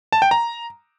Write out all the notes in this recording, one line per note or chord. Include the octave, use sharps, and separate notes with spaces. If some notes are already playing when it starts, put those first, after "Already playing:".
A5
G5
A#5